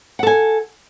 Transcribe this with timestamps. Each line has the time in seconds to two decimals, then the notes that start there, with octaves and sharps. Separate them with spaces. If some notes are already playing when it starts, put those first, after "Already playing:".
0.19 F#5
0.23 A4
0.27 G#5